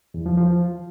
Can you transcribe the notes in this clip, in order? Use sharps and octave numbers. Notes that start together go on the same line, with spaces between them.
E2
F3
F3